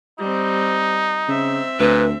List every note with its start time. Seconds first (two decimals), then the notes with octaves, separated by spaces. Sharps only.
0.19 G3 C4 D#4
1.28 C#3 C4 E5
1.79 D2 A#2 B4